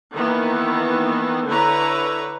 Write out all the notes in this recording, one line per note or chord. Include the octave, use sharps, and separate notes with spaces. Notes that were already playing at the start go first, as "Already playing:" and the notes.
D#3 E3 A#3 B3
D3 E4 B4 C#5 A#5